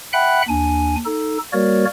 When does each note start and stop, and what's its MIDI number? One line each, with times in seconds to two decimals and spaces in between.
0.13 0.42 76
0.13 0.42 78
0.13 0.42 79
0.13 0.42 83
0.13 0.42 90
0.49 0.96 39
0.49 0.96 62
0.49 0.96 80
1.05 1.38 63
1.05 1.38 69
1.53 1.85 55
1.53 1.85 58
1.53 1.85 66
1.53 1.85 70
1.53 1.85 73
1.53 1.85 74